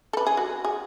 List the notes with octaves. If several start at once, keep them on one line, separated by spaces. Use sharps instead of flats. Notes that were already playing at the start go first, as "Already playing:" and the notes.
A4
B4
G#4
F#4
G#4